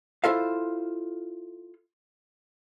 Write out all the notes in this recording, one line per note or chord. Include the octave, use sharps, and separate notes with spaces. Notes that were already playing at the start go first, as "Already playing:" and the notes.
E4 F4 A4 C5 F5